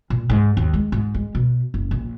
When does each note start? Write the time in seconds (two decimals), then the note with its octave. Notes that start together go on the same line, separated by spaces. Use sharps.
0.10 A#2
0.30 G#2
0.57 D#2
0.73 G#3
0.92 G#2
1.15 G#3
1.35 B2
1.74 F#1
1.91 A#1